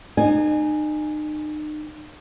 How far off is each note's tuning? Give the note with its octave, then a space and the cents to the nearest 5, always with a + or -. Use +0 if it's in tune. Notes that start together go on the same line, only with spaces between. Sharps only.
D#4 -40 G#5 +0